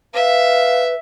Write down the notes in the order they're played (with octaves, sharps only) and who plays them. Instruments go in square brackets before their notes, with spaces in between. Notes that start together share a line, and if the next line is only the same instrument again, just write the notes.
[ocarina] B4 [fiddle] E5 [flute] F5